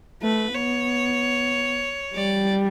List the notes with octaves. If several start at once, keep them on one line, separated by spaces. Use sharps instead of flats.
A3 B4
B3 C#5
G3 D5